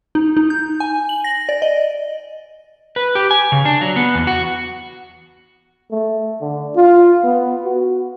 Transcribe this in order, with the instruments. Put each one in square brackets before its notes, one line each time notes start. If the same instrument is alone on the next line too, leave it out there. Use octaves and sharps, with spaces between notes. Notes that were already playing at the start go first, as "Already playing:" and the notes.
[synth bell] D#4
D#4
G6
G#5
F#7
A#6
D5
D#5
[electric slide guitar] B4
G4
G#5
C#3
D4
F#3
B3
E2
F#4
[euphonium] A3
D3
F4
B3
F#4